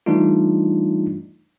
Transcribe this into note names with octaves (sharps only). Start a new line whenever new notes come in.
E3 G3 A3 D4 D#4 F4